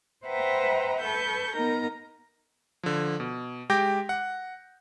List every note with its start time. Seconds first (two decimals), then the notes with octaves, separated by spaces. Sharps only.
0.25 B4 C5 E5 F#5 G5 A#5
1.00 A4 B4 C#6 G6
1.55 B3 D#4 A#4 A#5
2.83 D3 F3
3.20 B2
3.70 G#3 G4 G5 D6 G6 A#6
4.09 F#5